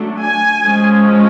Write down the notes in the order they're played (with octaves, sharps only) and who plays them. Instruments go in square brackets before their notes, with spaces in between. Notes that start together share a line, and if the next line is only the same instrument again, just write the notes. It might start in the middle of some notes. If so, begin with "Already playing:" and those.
Already playing: [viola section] F#3 A3 D4
G#5
F3 G#3 C#4